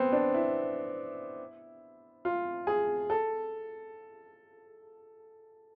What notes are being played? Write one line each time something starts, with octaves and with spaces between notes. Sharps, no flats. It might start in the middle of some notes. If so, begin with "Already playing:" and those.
Already playing: B3 C4
D4
E4
F4
G#4
A4